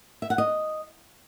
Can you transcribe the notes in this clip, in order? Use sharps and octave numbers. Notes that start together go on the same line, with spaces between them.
E5
F#5
D#5